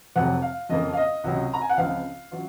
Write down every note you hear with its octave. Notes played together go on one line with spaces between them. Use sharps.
F1 F2 C3 F#3 C4 F#5
F5
F2 C#3 F3 A#3 D#5
F5
D#5
C#2 C3 F#3 C#4
A#5
G#5
F#5
C#2 C#3 F3 C4 F5
F#3 C#4 F4